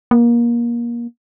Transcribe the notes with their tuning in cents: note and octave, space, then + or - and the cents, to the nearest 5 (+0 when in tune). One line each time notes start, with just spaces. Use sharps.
A#3 +25